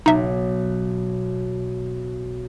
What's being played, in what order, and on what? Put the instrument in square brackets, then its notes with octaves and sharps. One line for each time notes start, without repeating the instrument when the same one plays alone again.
[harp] B1 [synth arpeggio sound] D#4 E5